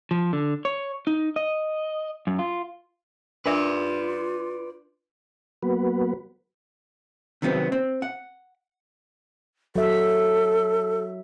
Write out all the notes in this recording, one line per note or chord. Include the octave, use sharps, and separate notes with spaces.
F3
D3
C#5
D#4
D#5
F#2
F4
D4 F4 A#4 B4 D5 E5
F#3 A#3 B3 F#4 B4
C3 D#3 F#3 B3 C4
C4
F#5
F#3 A4 E5